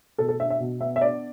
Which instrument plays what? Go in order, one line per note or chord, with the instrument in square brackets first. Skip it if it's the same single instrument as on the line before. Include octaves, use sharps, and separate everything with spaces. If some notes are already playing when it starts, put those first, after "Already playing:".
[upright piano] B2 A4
A4
D4 E5
E5
B2
B3 E5
E5
D4 D5